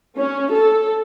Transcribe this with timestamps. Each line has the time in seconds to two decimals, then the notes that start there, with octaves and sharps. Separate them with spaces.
0.18 C#4
0.52 A4